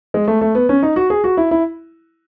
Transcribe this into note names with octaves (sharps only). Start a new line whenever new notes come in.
G#3
A3
A3
B3
C#4
D#4
F#4
G#4
F#4
E4
E4